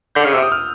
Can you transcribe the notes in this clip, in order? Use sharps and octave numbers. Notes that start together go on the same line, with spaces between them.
D3 G6
C#3 F6
C3 E6
D#6
F6